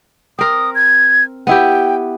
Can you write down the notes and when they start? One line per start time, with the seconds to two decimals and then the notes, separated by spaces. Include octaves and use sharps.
0.39 C4 A#4 D#6
0.75 G#6
1.47 B3 E4 G4 G5